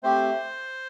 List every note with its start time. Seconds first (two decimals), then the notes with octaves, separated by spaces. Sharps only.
0.03 A3 C4 G4 C5